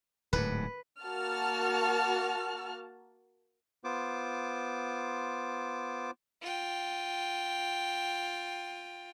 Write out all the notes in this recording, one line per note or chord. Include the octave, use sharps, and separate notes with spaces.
D1 G#2 B4
A#3 F#4 A5 F6
B3 F4 C5 D6
F4 G5